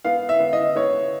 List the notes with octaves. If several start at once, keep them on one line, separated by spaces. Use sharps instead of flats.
B3 F5
E5
B3
D#5
B3 C#5